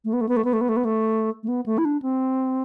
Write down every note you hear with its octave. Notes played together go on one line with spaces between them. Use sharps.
A3
B3
A3
B3
A3
B3
A3
B3
A3
B3
A3
A3
B3
A3
E4
D4
C4